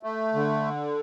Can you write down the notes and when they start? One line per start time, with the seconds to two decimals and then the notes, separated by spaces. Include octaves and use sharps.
0.03 A3
0.34 D3